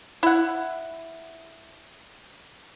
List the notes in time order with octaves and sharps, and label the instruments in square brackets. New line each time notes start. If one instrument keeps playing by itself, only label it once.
[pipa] E4 F#5